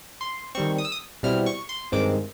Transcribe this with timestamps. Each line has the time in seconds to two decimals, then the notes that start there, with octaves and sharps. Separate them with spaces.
0.21 C6
0.55 D#3 G3 C4 C#6
0.78 D#6
0.85 E6
0.92 D#6
1.23 B2 G3 C4 E4 F6
1.46 C#6
1.69 C6
1.92 G2 D#3 G#3 C4 D6